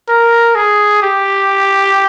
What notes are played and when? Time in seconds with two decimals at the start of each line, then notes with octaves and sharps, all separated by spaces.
0.09 A#4
0.55 G#4
1.02 G4